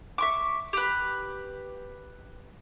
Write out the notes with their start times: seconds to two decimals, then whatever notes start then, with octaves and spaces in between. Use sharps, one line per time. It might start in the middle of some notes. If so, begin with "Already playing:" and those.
0.18 E5 C#6 D6
0.73 G4 B4